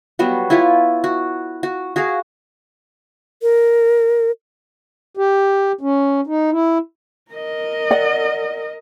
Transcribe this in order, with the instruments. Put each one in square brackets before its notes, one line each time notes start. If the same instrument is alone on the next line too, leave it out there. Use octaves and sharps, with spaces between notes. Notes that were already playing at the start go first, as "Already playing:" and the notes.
[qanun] F#3 G3 B3 F#4
E4 F4 B4 C#5
F#4
F#4
F#4 G#4 A#4 F5
[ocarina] A#4
[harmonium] G4
C#4
D#4
E4
[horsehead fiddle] A#4 D#5
[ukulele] D5 F#5